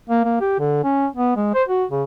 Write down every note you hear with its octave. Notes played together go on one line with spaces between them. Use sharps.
A#3
A#3
G4
D3
C#4
B3
G#3
C5
F#4
C#3